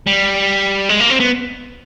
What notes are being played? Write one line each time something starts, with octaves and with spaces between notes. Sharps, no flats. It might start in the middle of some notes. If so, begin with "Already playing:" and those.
G3
G#3
A#3
C4
B3